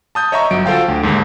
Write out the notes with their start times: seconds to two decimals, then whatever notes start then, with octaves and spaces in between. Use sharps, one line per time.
0.15 A5 D#6 G6
0.32 C#5 D#5 E5 A#5 C#6
0.50 G1 F#3 D7
0.66 F4 F#4 A4 C5 F5 G5
0.88 D2
1.03 D#2 G#2